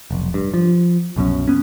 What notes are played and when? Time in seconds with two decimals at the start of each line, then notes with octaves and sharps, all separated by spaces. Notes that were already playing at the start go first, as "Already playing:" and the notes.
0.11 F1 B1
0.34 G2
0.54 F3
1.16 C2 F#2 B2 C#4
1.48 B3 C#4